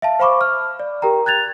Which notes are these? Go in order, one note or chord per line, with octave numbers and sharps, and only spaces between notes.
E5 F5 A5
C5 F5 B5 C#6 D6
F6
D5
G4 A#4 G5 A#5
F#6 G#6 A6 F7